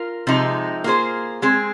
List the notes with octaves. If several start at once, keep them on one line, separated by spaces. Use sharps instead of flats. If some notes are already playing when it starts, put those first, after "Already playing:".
Already playing: F4 A#4
C3 F3 G#3 D#4
A#3 F4 G#4 C5
G#3 C4 G#4